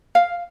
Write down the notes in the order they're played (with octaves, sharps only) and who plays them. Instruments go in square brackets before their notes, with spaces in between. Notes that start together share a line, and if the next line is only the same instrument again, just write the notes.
[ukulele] F5